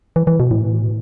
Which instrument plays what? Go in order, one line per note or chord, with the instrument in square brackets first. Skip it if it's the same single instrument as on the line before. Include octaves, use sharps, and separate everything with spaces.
[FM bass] E3
E3
B2
A2